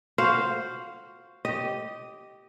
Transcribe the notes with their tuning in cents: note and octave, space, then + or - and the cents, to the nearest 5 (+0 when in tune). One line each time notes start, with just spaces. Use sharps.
F#4 +0 C5 +0 F5 +0
G4 -10 D#5 +0